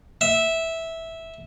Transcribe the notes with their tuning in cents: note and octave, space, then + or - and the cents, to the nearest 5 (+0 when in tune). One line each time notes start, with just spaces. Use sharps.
E5 -10